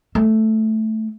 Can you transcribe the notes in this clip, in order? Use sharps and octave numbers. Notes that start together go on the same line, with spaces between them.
A3